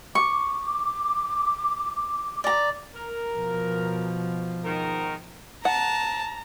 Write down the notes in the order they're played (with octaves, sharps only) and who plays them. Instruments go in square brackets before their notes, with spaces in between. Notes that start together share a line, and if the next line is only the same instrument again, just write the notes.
[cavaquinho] C#6 [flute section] D6
[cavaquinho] D5 A#5
[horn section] A#4
[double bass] B2 F3
[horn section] G#2 D#3 A#4
[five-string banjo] F#5 [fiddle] A5 [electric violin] A#5